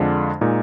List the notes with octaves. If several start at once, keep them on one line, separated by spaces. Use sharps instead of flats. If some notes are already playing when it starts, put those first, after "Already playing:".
Already playing: F2 D3 G#3 D4 F4
A#2 G#3 D#4